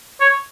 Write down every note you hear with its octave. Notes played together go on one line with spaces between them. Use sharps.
C#5